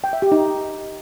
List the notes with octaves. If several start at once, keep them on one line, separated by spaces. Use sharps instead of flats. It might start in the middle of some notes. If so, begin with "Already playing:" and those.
G5
E5
G4
D#4